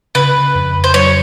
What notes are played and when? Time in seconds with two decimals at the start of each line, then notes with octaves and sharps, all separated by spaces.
0.15 C#3 B4
0.55 F2
0.84 C5
0.94 F#3 C#5